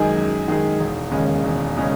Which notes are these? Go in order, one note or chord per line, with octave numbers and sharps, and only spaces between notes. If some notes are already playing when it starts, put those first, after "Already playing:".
Already playing: F#2 D#3 G#3 D#4 G#4
F#2
D#3 G#3 D#4 G#4
E1
D#2 C#3 G#3 C#4
E1
C#3 G#3 C#4